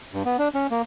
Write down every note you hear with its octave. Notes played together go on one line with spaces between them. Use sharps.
G2
B3
D4
C#4
A#3